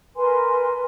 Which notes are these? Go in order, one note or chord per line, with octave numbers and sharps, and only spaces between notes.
A#4 B4 G#5 C6